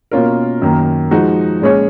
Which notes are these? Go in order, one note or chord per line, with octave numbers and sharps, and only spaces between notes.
B2 A#3 C#4 F4 A#4
F#2 D#3 A#3
F3 G#3 D#4 F#4
A#2 G#3 C#4 G#4 C#5